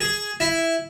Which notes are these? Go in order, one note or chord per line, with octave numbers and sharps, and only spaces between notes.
G#4
E4